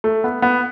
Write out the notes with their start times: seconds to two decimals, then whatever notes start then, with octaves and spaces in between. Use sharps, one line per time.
0.04 A3
0.24 B3
0.42 B3